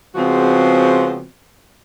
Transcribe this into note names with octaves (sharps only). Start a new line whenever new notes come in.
C#3 F3 G#3 B3 C4 F#4